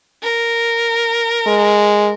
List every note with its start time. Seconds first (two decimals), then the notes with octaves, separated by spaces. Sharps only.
0.23 A#4
1.46 G#3